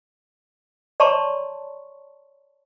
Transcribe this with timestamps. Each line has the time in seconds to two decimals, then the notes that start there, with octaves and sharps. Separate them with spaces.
1.00 C#5 D5 A5 A#5 C6 C#6